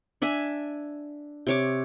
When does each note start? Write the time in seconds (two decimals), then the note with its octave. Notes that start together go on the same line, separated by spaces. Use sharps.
0.22 D4 E5 G#5
1.47 C3 C#5 D6